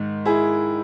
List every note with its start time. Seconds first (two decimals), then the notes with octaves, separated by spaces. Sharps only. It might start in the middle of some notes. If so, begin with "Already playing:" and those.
Already playing: G#2 D#3
0.26 E4 G#4